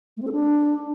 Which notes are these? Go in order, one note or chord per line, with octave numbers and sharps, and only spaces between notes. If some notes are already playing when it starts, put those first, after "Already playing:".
A3
C4
A4
D4